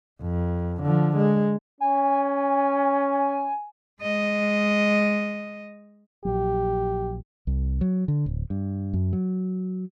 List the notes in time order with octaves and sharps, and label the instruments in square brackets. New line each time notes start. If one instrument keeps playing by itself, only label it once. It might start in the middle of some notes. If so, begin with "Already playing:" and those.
[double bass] F2
D3 F3
G#3
[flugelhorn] C#4 [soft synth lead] G#5
[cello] G#3 D#5
[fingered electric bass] A#1 F#3 [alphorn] G4
[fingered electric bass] C2
F#3
D3
D1
G2
F#2
F#3